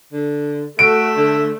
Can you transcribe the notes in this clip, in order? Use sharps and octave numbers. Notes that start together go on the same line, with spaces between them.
D3
A3 F#4 E5 D7
D3